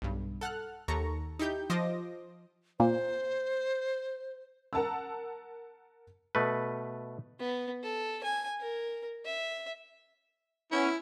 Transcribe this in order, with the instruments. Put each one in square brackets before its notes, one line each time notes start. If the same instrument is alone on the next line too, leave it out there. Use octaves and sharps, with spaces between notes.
[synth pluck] B1 G2
A4 F#5 F6 F#6
D#2 A4 A#5 C#6
D#4 E4 G4 G6
F3 C5 D#5 D6 A#6
[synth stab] A#2 [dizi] C5
[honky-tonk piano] A#4 F#5 A5 A#5 E6
[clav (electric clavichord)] B2 A3 B4
[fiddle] B3
A4
G#5
A#4
E5
[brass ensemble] B3 C#4 [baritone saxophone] E4